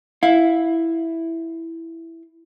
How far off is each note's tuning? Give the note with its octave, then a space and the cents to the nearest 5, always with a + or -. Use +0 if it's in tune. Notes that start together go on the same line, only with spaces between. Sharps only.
E4 +0 F5 +25